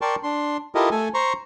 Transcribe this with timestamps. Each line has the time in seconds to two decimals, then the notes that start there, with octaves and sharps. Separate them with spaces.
0.01 A#4 D5 G5 A5 C6 C#6
0.23 D4 C6
0.75 E4 F4 G4 A4 A#4 D#5
0.91 A3 A4 G#5
1.14 C5 A#5 C6 C#6